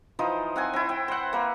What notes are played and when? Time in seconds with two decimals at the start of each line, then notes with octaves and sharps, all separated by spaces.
0.19 E3 F3 D#4 C5
0.56 C4 F#5 G#5
0.73 C4 E4
0.89 G5
1.08 C5 F#5
1.33 A#3 B4